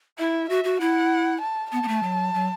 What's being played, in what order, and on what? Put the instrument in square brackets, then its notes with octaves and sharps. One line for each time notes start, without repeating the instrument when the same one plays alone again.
[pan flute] E4 [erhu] E5
[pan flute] F#4 [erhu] E5
[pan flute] F#4
[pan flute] E4 [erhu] F#5
[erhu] A5
[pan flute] B3 [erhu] A5
[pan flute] B3
A3
F#3
F#3